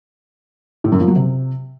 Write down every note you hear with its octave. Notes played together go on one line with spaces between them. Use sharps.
A2
F#2
F3
F#3
C3